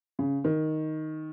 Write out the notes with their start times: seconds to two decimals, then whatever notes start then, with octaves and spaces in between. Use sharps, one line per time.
0.19 C#3
0.44 D#3